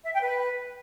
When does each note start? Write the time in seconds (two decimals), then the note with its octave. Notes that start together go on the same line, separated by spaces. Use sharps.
0.04 E5
0.12 G5
0.21 B4